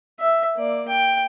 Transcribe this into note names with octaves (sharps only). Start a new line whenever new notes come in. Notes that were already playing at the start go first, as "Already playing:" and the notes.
E5
A#3 D5
G5